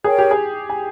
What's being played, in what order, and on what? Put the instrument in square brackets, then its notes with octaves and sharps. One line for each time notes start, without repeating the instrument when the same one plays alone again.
[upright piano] G#4 [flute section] A#4 C#5 G5
[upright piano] G4
G#4
G#5